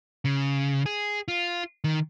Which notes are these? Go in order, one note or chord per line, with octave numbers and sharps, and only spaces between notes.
C#3
G#4
F4
D#3